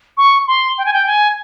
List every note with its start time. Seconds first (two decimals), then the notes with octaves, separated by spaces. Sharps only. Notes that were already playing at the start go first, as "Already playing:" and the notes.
0.17 C#6
0.47 C6
0.78 G5
0.86 G#5
0.93 G5
1.07 G#5